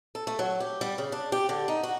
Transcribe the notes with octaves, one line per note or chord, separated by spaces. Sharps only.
A4
A3
F#3
G4
G3
C#3
D4
G4
D3
D#4
F#4